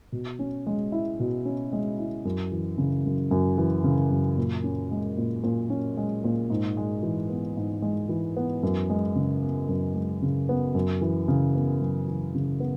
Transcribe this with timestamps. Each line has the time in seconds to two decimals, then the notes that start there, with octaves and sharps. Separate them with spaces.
0.12 B2
0.39 C#4
0.67 G#3
0.92 E4
1.20 B2
1.45 C#4
1.73 G#3
1.99 E4
2.25 F#2
2.52 E3
2.78 C#3
3.06 F#2
3.31 F#2
3.58 E3
3.84 C#3
4.11 F#2
4.37 A#2
4.64 C#4
4.91 G#3
5.17 A#2
5.44 A#2
5.70 C#4
5.97 G#3
6.24 A#2
6.50 G#2
6.77 G#3
7.03 E3
7.29 B3
7.57 G#2
7.82 G#3
8.09 E3
8.37 B3
8.63 F#2
8.90 G#3
9.15 C#3
9.42 B3
9.69 F#2
9.95 G#3
10.22 C#3
10.49 B3
10.75 F#2
11.01 E3
11.28 C#3
11.55 B3
11.81 F#2
12.08 E3
12.35 C#3
12.60 B3